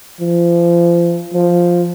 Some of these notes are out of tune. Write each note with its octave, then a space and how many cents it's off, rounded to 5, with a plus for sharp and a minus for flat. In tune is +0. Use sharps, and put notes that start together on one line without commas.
F3 -30
F3 +0